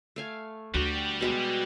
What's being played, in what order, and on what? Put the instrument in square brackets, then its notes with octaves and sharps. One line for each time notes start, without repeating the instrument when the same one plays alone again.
[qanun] A3 F5 G#5
[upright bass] D2 [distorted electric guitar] G3 G4 [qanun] F#4
[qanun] B2 G#3 F#4